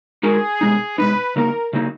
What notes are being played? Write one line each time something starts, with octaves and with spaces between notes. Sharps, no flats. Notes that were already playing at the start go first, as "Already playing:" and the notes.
G#3 D#4 F#4 G#4 A#4
B2 G#3 D#4
B2 G#3 D#4 B4
C#3 F#3 A#3 D#4 A#4
C#3 F#3 A#3 D#4